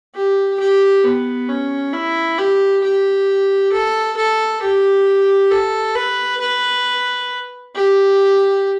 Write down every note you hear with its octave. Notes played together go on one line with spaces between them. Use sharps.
G4
G4
B3
C#4
E4
G4
G4
A4
A4
G4
A4
B4
B4
G4